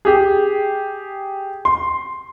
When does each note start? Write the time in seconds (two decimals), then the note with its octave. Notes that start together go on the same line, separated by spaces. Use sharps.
0.05 G4 G#4
1.65 C6